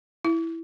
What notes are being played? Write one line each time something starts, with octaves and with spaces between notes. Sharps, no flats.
E4